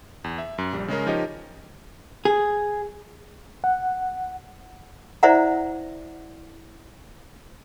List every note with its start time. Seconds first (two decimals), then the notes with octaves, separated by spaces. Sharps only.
0.24 E2
0.38 E5
0.58 F#2
0.73 A#1 G3
0.88 C#3 G#3 C#4 A#4
1.06 F3 D#4 G4 A#4 C#5 D#5
2.25 G#4
3.64 F#5
5.23 E4 C5 D5 E5 F#5 A#5